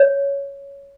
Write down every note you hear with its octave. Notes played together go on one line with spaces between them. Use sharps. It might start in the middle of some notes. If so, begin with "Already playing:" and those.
Already playing: C#5